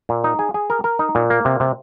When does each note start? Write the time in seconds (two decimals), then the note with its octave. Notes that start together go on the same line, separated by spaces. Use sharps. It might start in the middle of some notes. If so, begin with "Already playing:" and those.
0.09 A#2
0.24 D#4
0.39 G#4
0.54 G#4
0.70 A#4
0.84 A#4
0.99 D#4
1.15 A#2
1.30 A#3
1.45 C3
1.60 C3